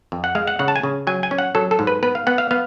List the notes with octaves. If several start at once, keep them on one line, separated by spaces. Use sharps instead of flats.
F2
F#5
G#3 F5
F#5
C#3 F#5
A5
G#5
C#3
F#3 G#5
G#5
C#4
F#5
F#3 A4
A4
G#2
B4
B3 B4
F5
B3 F#5
F5
B3 F5